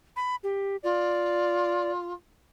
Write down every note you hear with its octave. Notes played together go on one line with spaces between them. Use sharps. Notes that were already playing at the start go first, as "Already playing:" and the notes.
B5
G4
F4 D5